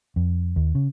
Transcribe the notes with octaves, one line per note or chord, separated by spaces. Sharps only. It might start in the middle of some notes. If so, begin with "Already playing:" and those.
F2
D#2
C#3